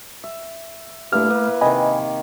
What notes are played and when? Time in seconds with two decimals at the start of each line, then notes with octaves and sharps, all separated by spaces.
0.24 E5
1.13 G2 A3 A#3 E4 F6
1.30 A#3 B4
1.61 C3 D#3 D#5 G#5 B5